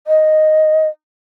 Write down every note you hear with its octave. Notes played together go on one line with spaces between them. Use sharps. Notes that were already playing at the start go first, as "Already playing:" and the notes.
D#5